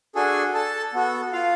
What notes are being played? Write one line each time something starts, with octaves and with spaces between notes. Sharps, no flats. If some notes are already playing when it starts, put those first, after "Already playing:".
D4 F#4 G#4 A4 G#5
A4 A5
B3 F#4 A4
F4 F5